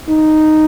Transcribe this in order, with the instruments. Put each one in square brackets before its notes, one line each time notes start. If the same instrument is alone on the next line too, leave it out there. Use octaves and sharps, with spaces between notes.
[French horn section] D#4